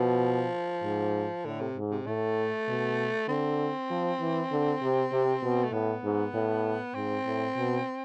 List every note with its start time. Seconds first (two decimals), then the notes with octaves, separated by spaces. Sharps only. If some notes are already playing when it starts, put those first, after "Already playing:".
Already playing: B2 F3
0.84 G#2
1.45 A2 D3
1.60 C3
1.76 G#2
1.91 C3
2.06 A2 A3
2.68 B2
3.28 D3 C4
3.90 F3
4.21 E3
4.51 D3
4.82 C3
5.12 C3
5.43 B2
5.64 A3
5.72 A2 B3
6.04 G#2
6.34 A2
6.95 G#2 C4
7.26 A2
7.57 B2